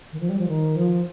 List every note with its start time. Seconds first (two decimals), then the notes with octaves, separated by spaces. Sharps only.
0.12 D#3
0.20 F3
0.29 G3
0.39 F3
0.48 D#3
0.76 F3